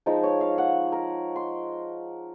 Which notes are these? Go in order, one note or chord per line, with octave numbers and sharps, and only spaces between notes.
F3 G#3 D#4 A#4
C#5
F5
F#5
A#4
C6